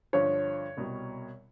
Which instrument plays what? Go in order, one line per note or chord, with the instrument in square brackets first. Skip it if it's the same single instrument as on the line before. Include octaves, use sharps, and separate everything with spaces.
[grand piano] G2 D3 F3 [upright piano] C#5
[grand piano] C2 B2 G3